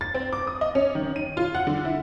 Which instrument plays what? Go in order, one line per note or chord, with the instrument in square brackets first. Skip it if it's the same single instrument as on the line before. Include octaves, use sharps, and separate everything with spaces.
[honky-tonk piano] A6
C4
D6
D#6
D#5
C#4
D#3
D#7
F4
F#5
D3
E4